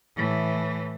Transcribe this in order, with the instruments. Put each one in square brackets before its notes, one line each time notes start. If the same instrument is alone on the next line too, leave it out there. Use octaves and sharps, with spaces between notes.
[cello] A2 E3